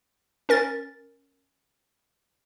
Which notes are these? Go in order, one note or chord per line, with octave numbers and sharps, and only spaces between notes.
C#4 A#4 A6